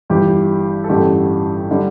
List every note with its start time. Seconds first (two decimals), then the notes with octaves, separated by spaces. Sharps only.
0.10 G1 G2 E3 G4
0.84 A4
0.89 A1 G2 D3 A3 G4
1.71 D3 G3